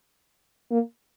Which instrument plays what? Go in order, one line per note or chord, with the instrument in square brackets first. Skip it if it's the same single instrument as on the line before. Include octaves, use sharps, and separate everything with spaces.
[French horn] A#3